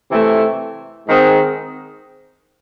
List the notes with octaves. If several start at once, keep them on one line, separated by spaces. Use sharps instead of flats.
C3 E3 A3
G#2 D#3 G#3 C4